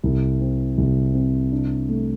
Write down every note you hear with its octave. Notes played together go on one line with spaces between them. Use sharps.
C2
C4
C2
C4
D4
A3